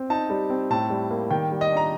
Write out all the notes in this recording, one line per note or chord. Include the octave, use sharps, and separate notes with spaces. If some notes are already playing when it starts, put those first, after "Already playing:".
Already playing: C4
D#4 A5
G3
C4
A2 A5
G3
A#3
D#3 G5
G3
D#5
D4
A#5